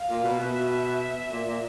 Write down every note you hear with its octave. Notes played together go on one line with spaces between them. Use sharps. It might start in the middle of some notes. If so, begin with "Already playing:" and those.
Already playing: F5
A#2
B2
B2 E5
A#2
A#2